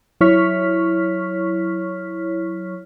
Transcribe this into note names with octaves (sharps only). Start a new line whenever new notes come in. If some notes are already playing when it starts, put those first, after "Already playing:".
F#3 E4 C#5 C#6 F6 B6